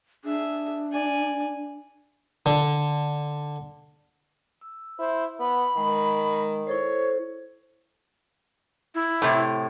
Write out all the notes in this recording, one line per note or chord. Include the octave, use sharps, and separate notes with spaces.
D4 G#4 E5
D5 G#5
D3
E6
E4 C5
B3 B5
D#3 G#3
E4 A4 C5 C#5
E4
A2 C3